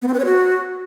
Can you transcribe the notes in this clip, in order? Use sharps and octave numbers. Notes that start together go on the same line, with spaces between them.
B3
C4
B4
C#5
F#4